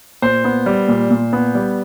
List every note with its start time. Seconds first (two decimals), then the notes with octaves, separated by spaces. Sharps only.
0.22 A#2 C5
0.44 B3
0.66 G3
0.88 A#2
1.10 A#2
1.33 B3
1.55 G3